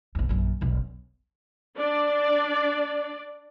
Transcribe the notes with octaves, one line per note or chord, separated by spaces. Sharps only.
A#1 E2
A#1 F#2
E1 B1
D4 D5